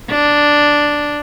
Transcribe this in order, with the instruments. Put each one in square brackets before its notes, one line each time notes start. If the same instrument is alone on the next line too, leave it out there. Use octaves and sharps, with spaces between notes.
[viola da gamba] D4